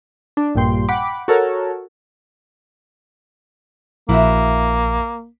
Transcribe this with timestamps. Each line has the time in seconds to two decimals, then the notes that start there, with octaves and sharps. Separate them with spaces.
0.37 D4
0.55 A#1 G2 A#2 G5 C6
0.89 F#5 G5 B5 D6
1.28 F#4 A4 A#4 C#5
4.09 A#1 A#3 E4 F#4 E5